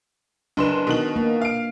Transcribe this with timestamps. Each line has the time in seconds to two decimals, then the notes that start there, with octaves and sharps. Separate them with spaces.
0.57 F#1 D4 B4 C6 E7
0.87 B2 D#3 F#7
1.16 A#3
1.42 F5 D7